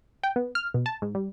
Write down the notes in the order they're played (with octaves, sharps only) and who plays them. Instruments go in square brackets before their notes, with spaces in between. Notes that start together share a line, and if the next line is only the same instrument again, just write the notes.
[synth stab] G5
B3
F6
B2
A5
G#2
G3